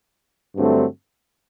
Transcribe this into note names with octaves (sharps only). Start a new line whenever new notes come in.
G2 D3 F#3 A3 C4